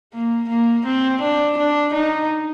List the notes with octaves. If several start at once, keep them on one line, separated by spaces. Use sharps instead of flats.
A#3
A#3
C4
D4
D4
D#4